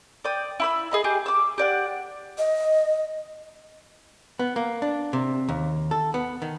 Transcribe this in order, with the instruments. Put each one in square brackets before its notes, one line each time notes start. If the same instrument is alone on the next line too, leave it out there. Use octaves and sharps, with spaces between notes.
[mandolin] D5 G5 D#6
E4 B5 E6
G#4 D#5 B5
G4 G#4
D6 E6
G4 D5 F#5
[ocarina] D#5
[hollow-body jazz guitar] B3
A#3
D4
C3
D#2
A4
B3
D#3